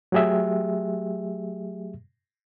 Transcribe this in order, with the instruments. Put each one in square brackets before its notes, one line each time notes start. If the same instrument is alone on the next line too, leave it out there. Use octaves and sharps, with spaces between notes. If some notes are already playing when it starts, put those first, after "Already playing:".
[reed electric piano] F#3 A3 G4 G#4 E5